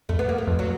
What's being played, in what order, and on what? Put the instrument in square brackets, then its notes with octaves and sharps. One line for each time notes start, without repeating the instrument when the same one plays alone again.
[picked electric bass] F2 [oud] A3
[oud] B3
A#3
A3
[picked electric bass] F2
[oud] F#3